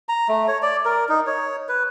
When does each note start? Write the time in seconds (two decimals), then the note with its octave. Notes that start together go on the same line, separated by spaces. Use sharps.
0.09 A#5
0.29 A3
0.48 C#5
0.63 D5
0.85 A#4
1.09 D#4
1.27 C#5
1.69 B4